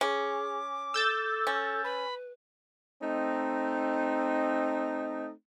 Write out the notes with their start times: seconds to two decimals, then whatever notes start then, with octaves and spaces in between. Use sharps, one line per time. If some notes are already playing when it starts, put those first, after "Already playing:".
0.01 C#4 G#4 D6
0.94 A4 E6 G6 A6
1.47 C#4
1.84 B4 B5
3.02 A3 C4 D#4